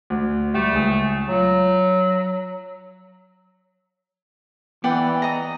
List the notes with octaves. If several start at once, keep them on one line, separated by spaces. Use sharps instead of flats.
D2
G3 A3 G4
C#2 G#4
F#3 F4
E3 B3 D5 F#5 G5
D#5 A#5